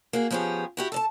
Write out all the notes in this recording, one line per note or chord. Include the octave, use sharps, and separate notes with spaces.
A#3 F#4 G#4
F3 B3 C#4 G4 G#4
E4 F#4 G4
A4 D5 A5